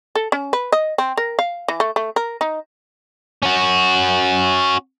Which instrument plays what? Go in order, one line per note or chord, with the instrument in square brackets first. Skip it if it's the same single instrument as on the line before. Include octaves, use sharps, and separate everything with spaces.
[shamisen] A4
C#4
B4
D#5
C4
A#4
F5
E3
A3
A3
A#4
D#4
[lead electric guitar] C#4 F#4